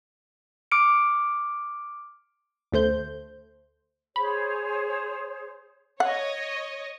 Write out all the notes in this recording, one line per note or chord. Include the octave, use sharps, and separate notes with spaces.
D6 F6 C#7 D7
D2 A3 C5 G6
G#4 C5 C#5 B5
C#5 D#5 F#5